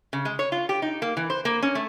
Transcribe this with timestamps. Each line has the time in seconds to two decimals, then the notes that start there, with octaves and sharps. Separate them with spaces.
0.13 C#3
0.25 G#3
0.39 C#5
0.52 F4
0.69 G4
0.82 D#4
1.02 A#3
1.17 E3
1.30 C5
1.45 A#3
1.63 C#4
1.75 A3